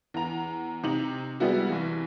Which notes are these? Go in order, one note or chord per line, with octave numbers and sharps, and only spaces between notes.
E2 A#5
C3 D#4 F#7
G3 G#3 B3 E4 F#4
C2 E3